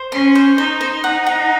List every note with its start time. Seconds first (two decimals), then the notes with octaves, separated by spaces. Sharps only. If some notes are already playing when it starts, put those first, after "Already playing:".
Already playing: C5
0.12 C#4 C6
0.35 C5
0.58 D#4 C5
0.81 C5
1.04 D#4 F#5
1.26 F#5